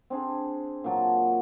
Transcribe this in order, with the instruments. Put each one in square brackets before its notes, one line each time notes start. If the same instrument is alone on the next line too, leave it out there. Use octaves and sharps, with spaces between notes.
[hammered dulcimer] C4 D4 G#4
A#2 F#3 A5